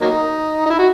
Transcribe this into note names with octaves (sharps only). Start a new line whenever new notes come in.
F#3 A#3 D#4
D#4
E4
F#4